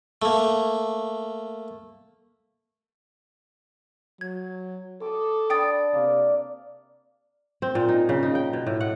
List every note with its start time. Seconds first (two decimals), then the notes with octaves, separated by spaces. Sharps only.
0.22 A3 A#3
4.21 F#3 G#6
5.01 A4 D6 D#6
5.50 D4 G5 B5 D#6 A6
5.94 C3 A#3 D5
7.62 C4
7.75 A#2
7.89 D#4
8.09 C#3
8.23 D#4
8.35 G5
8.53 B2
8.66 A2
8.81 F#5